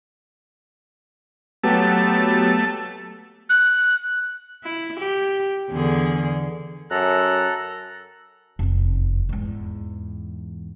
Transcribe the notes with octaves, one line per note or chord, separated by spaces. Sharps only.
F#3 A3 B3 G4
F#6
E4
G4
E2 D3 G#4
F#2 A4 A#5 F#6
F1 E2
E2 G#2